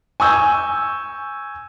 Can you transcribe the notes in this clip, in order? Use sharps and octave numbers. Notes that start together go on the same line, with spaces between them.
G#5 C#6 E6 G6